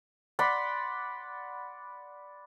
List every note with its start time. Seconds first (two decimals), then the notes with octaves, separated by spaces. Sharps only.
0.39 D5 F#5 B5 C6